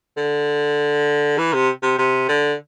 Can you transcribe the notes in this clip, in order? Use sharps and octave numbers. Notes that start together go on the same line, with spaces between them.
D3
E3
C3
C3
C3
D3